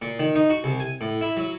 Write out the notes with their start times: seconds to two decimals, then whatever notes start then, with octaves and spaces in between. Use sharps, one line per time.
0.02 A#2
0.19 D#3
0.35 D#4
0.50 F#4
0.64 C2
0.80 G#5
1.01 A2
1.21 E4
1.37 F#3